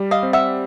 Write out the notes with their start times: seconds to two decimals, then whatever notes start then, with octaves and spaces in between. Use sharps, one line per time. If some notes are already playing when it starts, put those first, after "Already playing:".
Already playing: G3
0.11 D#5 F5
0.23 C4
0.33 E5 F#5